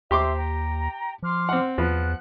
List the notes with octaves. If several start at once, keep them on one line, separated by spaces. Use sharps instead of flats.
D#2 G4 C5 E5 A#5 C6 D6
G5 A#5
F3 C6 D6 F6
C4 F#5
E2 F3 B3 F#5 F#6